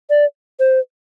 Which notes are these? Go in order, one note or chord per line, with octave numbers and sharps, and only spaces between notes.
D5
C5